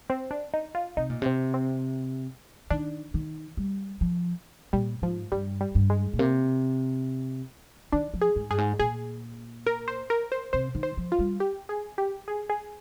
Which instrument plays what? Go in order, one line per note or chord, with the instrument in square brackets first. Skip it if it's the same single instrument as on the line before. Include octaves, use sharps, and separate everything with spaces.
[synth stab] C4
D4
D#4
F4
[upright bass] C3 [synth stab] D#4
[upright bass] A#2
[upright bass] C3 [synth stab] C4
[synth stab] C4
[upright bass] D#3 [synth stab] D4
[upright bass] D#3
G3
F3
[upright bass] A#2 [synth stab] G3
[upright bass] G#2 [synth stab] F3
[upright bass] G2 [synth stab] G3
[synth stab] G3
[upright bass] G2
[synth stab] G#3
[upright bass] A#2
[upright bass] C3 [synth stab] A#3
[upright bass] D#3 [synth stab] D4
[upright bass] F3
[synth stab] G#4
[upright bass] G#2
[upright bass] G2 [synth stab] G#4
[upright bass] G#2
[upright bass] A#2 [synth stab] G#4
[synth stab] A#4
C5
A#4
C5
[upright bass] C3 [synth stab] C5
[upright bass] D#3
[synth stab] C5
[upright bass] F3
[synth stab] F4
[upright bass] G3
[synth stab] G4
G#4
G4
G#4
G#4